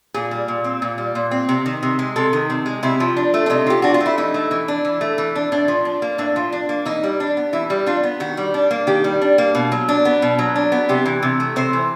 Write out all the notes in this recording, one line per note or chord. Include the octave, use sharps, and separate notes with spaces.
A#2 G#4
G3
A#2
C4
A#2
G3
A#2
C4
C3
D#3
C3
G#3
C3 A4
D#3
C3
G#3
C3 E4
F3
D4
A3
D4
C3 D#4
F3 G4
D4 F#4
F4
A3
E4
E3 D#4
A3
E3
D4
E3
A3
E3
D4
A2 D4
F3
D4
A#3
A2 D4
F3
D4
A#3
E3 D#4
G3
D4
B3
E3 E4
G3
D4 F4
B3
D#3 F#4
G3
D4
A#3
D#3 G4
G3
D4
A#3
B2
F#3
D4
B3
B2
F#3
D4
B3
C3 G4
E3
C3
A3
C3 C5
E3